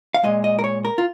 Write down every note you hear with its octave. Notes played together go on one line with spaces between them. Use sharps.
F5
A#2 G#3 D#5
D#5
A#4
C#5
A#4
F4